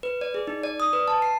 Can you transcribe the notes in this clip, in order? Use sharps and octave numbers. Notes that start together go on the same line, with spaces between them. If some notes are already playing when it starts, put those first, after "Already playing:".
B4
D5
G#4
D#4
D5
D#6
B4
A5
C7